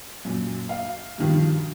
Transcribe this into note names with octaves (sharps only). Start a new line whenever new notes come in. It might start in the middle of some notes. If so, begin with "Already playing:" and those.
F#2 A#2
F5
G2 B2 D#3 F3